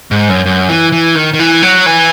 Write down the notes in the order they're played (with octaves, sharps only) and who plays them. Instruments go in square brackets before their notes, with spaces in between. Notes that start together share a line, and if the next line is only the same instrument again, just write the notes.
[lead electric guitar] G#2
F#2
F#2
E3
E3
D#3
D#3
E3
F#3
E3